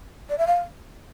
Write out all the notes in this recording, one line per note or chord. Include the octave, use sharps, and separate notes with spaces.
D5
E5
F5